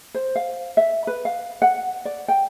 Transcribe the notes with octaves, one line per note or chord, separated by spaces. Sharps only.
C5
F5
E5
B4
F5
F#5
D5
G5